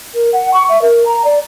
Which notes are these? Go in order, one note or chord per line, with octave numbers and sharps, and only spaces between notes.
A#4
F#5
C#6
E5
A#4
A#5
D5